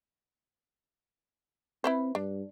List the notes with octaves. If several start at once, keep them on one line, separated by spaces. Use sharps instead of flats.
C4 E4 B4 C5
G2 D4